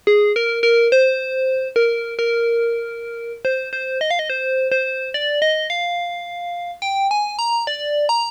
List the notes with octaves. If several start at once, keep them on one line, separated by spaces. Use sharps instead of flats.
G#4
A#4
A#4
C5
A#4
A#4
C5
C5
D#5
F5
D#5
C5
C5
D5
D#5
F5
G5
G#5
A#5
D5
A#5